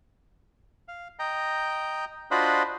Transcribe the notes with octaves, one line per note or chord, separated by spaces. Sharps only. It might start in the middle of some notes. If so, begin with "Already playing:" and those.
F5
D#5 G5 A#5
D4 F4 F#4 C5 D#5 B5